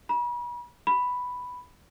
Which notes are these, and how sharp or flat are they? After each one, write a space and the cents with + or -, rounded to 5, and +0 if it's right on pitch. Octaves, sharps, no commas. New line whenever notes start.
B5 -40
B5 +5